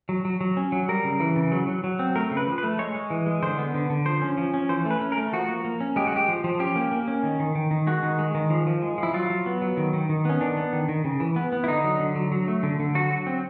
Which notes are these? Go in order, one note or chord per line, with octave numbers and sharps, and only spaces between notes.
F#3
F#3
F#3
C#4
F#3
G3 A#4
C#3
E3
C#3
F#3
F#3
F#3
C4
A3 A#4
C#3
B4
F3
B4
A3
G#3 C#5
G#3
E3
G#3
D3 C5
B3
D3
D3
F3 C5
C#4
F3
C#4
E3 C5
A3
B4
C#4
A#4
A3
F3 F#4
A#3
A#3
C#4
G#3 G4
F#4
G#3 G4
F3
F3
C#4 G4
A#3
A#3
C#4
D#3
D#3
D#3
D#3
G#3 F#4
D#3
G#3
D#3
F3
F3
G#3
F3
E4
F#3 F4
F#3
B3
F#3
D#3
D#3
D#3
B3 C#4
D#3 D4
B3
D#3
D#3
C#3
E3
B3
B3
E4
D3 D#4
F#3
D3
F#3
F#3
A3
D3
D3
F#3 F#4
F#3
C4